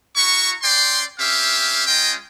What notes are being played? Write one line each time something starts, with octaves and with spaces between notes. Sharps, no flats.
E4 F#4 A#5 C#6
C#4 D5 G5 C6
C4 C#4 G4 E5 F5
G#3 C#4 F4 D#5 G5